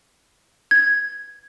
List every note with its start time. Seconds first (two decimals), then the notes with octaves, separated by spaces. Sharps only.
0.71 G#6